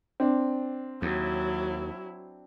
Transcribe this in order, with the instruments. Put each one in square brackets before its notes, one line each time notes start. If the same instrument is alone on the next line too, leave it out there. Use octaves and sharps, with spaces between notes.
[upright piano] C4 D4
[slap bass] D#2 [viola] F#3 E4